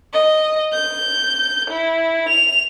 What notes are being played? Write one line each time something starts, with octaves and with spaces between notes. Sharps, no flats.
D#5
G6
E4
F7